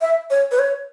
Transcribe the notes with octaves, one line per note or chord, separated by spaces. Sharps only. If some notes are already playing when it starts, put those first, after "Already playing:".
E5
C#5
B4
C#5